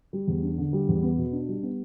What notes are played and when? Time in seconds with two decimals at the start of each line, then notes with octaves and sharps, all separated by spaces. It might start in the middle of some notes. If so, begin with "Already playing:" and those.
0.13 G3
0.27 E2
0.43 D4
0.58 D3
0.73 G3
0.88 E2
1.03 B3
1.18 B2
1.32 D4
1.48 G3
1.63 B3